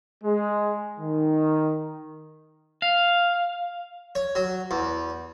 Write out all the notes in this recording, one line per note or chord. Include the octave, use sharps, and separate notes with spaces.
G#3
D#3
F5
C#5
F#3
E2